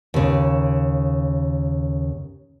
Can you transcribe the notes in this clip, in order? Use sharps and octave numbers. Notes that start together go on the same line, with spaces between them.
D#2 C#3